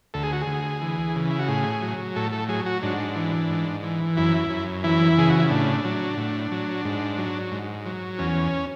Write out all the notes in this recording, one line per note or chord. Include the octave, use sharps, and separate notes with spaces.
D2 A4
G#4
F#4
G#4
D2
E3
C#3
E4
F#4
A2 G#4
F#3
A2 A4
A4
F#3 G#4
F#4
G#2 D4
E3
G#2
E3
F#2 E4
F#2
E3 E4
C#3 G#4
F#4
E4
A2 D4
F#3
A2
F#3
G#2
F#3
G#2
F#3
E2 C#4